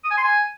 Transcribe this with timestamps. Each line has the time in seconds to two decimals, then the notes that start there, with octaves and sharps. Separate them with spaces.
0.04 D#6
0.11 G#5
0.17 C6
0.24 G#5